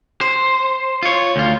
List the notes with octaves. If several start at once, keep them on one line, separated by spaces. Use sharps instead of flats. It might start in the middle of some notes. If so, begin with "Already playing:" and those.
C5
F4 C#5
D2 F4